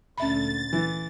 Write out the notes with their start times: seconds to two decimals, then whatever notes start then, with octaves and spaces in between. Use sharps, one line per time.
0.18 D2 A#2 C#4 E5 B5 A6
0.73 E3